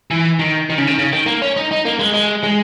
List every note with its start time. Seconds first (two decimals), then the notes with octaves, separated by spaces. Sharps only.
0.11 E3
0.39 D#3
0.70 D#3
0.78 C#3
0.87 D#3
0.99 C#3
1.13 D#3
1.27 A#3
1.42 C#4
1.57 D#4
1.71 D#4
1.85 A#3
1.99 G#3
2.14 G#3
2.43 G#3